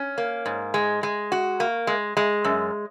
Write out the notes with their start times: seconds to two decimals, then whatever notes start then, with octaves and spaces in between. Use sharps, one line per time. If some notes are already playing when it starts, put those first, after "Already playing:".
Already playing: C#4
0.18 A#3
0.46 G#2
0.74 G#3
1.03 G#3
1.32 F#4
1.60 A#3
1.87 G#3
2.17 G#3
2.44 F#2